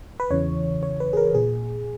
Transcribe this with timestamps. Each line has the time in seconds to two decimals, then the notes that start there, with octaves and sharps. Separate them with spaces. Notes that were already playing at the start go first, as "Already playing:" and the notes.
0.20 B4
0.31 E2 C#3 E3 C#5
0.83 C#5
1.00 B4
1.13 G#4
1.17 A#4
1.35 A#2 G#4